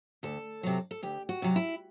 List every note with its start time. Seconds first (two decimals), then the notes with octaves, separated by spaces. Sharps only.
0.23 D2 A4
0.63 C3 F#3
0.91 A4
1.03 D2 G4
1.29 F#4
1.42 C3 F#3
1.56 E4